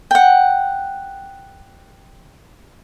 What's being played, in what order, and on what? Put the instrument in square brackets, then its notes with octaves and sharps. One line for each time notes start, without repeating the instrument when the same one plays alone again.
[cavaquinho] F#5 G5